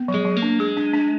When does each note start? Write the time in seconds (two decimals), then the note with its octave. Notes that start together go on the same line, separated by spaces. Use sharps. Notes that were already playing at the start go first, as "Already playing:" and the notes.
Already playing: B3
0.08 F#3
0.14 G#3
0.25 F#3
0.37 A#3
0.42 D4
0.59 G#3 G#4
0.77 D4
0.93 D4